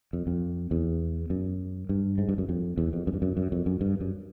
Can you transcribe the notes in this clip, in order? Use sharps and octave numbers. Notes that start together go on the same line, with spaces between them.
F2
F2
E2
F#2
G2
G#2
G2
F#2
F2
E2
F2
F#2
G2
F#2
F#2
F2
F#2
G2
F#2